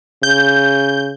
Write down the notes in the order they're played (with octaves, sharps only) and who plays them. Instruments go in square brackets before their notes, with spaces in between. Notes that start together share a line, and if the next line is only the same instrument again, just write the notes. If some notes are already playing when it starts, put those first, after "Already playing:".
[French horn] C#3 [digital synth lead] G6